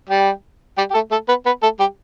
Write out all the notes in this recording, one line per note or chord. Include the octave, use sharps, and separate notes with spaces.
G3 G4
G3 G4
G4
A3 A4
A3 A4
B3 B4
B3 B4
A3 A4
G3 G4